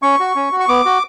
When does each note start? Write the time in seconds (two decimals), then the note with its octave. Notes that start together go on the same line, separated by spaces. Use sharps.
0.02 C#4 C#6
0.20 F#4
0.36 C#4
0.52 F#4
0.60 C#6
0.68 B3 D6
0.85 F#4